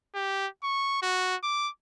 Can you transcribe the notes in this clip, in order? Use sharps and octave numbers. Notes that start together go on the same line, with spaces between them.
G4
C#6
F#4
D6